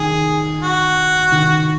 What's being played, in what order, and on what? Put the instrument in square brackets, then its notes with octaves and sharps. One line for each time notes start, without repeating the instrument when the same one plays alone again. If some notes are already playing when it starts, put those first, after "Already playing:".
Already playing: [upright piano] D#3 [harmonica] G#4
[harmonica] F#4
[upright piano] D#3